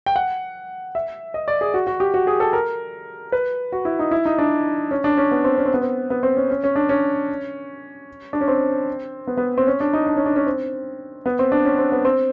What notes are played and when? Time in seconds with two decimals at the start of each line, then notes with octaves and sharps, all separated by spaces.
0.06 G5
0.16 F#5
0.95 E5
1.34 D#5
1.48 D5
1.61 G#4
1.74 F#4
1.87 F#4
2.00 G4
2.14 F#4
2.27 G#4
2.40 A4
2.53 A#4
3.32 B4
3.72 F#4
3.85 E4
3.99 D#4
4.11 E4
4.26 D#4
4.39 D4
4.91 C#4
5.04 D4
5.17 C#4
5.31 B3
5.44 C4
5.58 C#4
5.66 C4
5.74 B3
5.81 C4
6.10 B3
6.23 C4
6.37 C#4
6.50 C#4
6.64 C#4
6.76 D4
6.89 C#4
8.33 D4
8.41 C#4
8.48 C4
9.27 B3
9.37 B3
9.58 C4
9.67 C#4
9.80 D4
9.93 D#4
10.07 D4
10.17 C#4
10.26 D4
10.36 C#4
10.46 C4
11.26 B3
11.39 C4
11.52 D4
11.65 C#4
11.79 C4
11.92 B3
12.05 C4